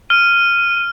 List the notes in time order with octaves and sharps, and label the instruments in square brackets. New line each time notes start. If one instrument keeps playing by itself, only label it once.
[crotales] F6 [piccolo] D#7